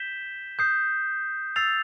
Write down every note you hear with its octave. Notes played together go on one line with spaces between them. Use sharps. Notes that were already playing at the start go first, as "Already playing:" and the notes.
Already playing: G6 B6 E7 G7
D#6 G6 C7
E6 A6 C7 F7